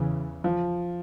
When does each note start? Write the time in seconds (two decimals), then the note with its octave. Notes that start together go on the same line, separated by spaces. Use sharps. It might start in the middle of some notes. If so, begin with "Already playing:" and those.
Already playing: E2 C#3 E3
0.44 F3